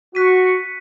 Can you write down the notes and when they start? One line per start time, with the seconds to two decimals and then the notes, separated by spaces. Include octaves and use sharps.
0.15 F#4 C#6 F#6 B6 D#7